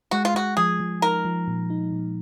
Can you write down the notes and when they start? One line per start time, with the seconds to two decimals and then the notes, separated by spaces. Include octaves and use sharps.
0.11 G#3 F#4
0.25 F4
0.35 G#3 F#4
0.57 F3 G#4
0.80 F3
1.02 D#4 A#4
1.25 F3
1.48 A#2
1.70 D#4
1.92 A#2